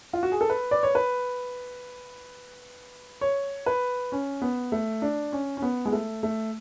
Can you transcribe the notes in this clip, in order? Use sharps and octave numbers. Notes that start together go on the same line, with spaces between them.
F4
F#4
G#4
A4
B4
D5
C#5
B4
C#5
B4
C#4
B3
A3
D4
C#4
C#4
B3
G#3
A3
A3